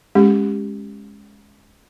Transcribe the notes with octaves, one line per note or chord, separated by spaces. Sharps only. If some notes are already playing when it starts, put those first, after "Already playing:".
G#3 C#4 G4